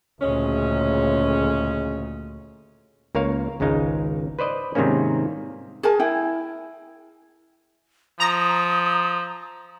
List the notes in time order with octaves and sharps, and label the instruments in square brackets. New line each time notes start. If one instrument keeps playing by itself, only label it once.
[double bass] D2 A#2 [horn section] C#3 G#3 C#4
[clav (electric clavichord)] C#2 A#3 A#4 C#5 F5
G#1 C#2 G#3 D#4 F5
B4 C5 D5 D#5
G#2 C3 D#3 G3 A#3 C#4
[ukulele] G#4 A#4 G#5 A5
E4 G5 G#5
[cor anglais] F3 [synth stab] A#5 [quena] D#6